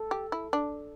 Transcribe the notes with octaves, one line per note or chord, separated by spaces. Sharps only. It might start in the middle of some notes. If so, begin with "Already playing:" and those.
Already playing: A4
G4
E4
D4